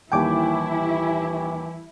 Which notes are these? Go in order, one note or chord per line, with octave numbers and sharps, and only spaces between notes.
D#1 D#2 E3 E4 G5 G#5 D6